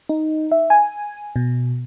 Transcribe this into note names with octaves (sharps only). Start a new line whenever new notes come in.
D#4
E5
G#5
B2